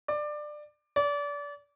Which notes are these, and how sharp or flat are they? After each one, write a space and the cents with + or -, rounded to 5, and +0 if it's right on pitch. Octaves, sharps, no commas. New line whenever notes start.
D5 +20
D5 -30